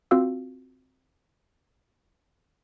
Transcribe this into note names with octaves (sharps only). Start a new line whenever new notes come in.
C4 F4 F#4 F5 E6